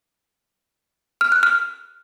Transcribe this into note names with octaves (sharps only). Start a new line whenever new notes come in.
F6
F#6
F6